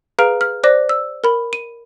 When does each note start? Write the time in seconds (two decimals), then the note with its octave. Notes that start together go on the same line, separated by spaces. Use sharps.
0.19 G#4 B4 F5 A#5 F6 D7
0.41 F6
0.64 C5 D5 D6 F#6 A#6
0.89 E6
1.24 A#4 B5
1.53 D#7